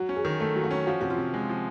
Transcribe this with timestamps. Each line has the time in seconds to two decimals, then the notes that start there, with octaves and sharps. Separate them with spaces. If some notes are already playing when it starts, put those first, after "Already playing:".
Already playing: F#3 F#4
0.09 C#4
0.16 G#4
0.25 D#3
0.40 A3 A4
0.56 F#3
0.64 F#4
0.71 C#4
0.87 F3 F#4
1.01 C3 F#4
1.10 F4
1.18 C3
1.34 G#3
1.49 F3